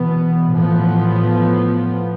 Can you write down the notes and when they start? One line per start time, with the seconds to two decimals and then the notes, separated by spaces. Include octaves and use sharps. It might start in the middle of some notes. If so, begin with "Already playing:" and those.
Already playing: B2 E3 B3
0.51 A2 F3 B3